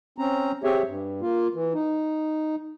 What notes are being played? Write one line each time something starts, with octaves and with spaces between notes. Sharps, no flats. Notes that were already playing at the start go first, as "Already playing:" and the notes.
C4 C#4 A#5
C4 G4 G#4 C#5 E5
G2
A#3 F4
E3
D#4